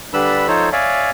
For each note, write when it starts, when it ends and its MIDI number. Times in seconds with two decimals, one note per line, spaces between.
0.14 0.47 50
0.14 0.47 55
0.14 0.47 62
0.14 0.47 71
0.14 0.47 83
0.14 0.47 88
0.48 0.69 53
0.48 0.69 63
0.48 0.69 69
0.48 0.69 72
0.48 0.69 73
0.72 1.10 73
0.72 1.10 74
0.72 1.10 76
0.72 1.10 77
0.72 1.10 80